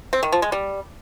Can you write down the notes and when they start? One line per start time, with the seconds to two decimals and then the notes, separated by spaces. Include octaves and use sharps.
0.13 C4
0.23 D#3
0.32 F3
0.42 G#3
0.52 G3